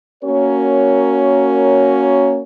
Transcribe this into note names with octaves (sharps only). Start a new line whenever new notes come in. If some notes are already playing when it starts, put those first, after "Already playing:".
A#3 C#4 F#4 A#4 C#5